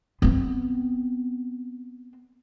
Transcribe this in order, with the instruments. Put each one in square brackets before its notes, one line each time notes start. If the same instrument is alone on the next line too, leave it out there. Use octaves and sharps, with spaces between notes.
[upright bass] B3 C4